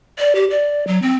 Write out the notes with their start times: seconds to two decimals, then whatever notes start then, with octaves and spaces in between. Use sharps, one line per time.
0.19 D5
0.35 G4
0.50 D5
0.87 F#3
1.02 C4